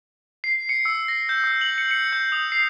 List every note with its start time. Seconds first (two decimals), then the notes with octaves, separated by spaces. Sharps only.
0.44 C7
0.69 C#7
0.85 E6
1.08 A#6
1.29 G6
1.44 E6
1.61 F#7
1.78 C#7
1.91 C#7
2.12 G6
2.32 D#6
2.52 C7